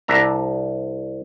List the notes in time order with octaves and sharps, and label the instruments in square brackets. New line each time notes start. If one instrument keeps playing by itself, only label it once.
[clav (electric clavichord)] C2 D4 E5 A#5